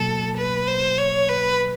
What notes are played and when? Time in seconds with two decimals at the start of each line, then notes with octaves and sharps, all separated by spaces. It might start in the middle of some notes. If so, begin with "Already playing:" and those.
Already playing: B2 F#3 A#3 A4
0.37 B4
0.68 C5
0.98 C#5
1.29 B4